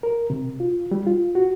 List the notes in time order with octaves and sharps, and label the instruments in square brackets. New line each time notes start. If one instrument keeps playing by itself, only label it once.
[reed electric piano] A#4
C3
F4
G3
F4
F#4